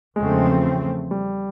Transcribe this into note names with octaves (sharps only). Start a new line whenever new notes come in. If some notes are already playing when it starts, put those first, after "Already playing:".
E2 C#3 F3 G#3 A3 C4
G3